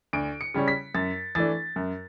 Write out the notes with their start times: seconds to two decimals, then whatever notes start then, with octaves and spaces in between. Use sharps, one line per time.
0.13 D2 D7
0.41 C#7
0.54 C#3 G3 C#4
0.68 B6
0.94 F#2 A6
1.35 E3 A3 D4 A6
1.76 F#2